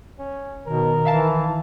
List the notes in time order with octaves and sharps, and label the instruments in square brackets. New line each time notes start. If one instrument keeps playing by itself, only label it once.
[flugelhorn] C#4
[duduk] B2 [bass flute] D#3 [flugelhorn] A#4
[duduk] E3 [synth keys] E5 F5 A5